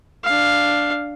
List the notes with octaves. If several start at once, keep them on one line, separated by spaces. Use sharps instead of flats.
D4 F5